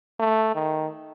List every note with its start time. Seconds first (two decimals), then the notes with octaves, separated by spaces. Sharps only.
0.20 A3
0.55 D#3